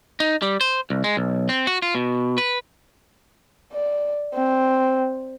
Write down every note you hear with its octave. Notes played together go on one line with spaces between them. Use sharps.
D#4
G3
C5
C2
G#3
B1
C4
F#4
F4
B2
B4
D5
C4